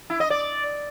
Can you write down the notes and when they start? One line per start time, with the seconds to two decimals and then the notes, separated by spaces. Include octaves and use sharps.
0.10 E4
0.20 D#5
0.30 D5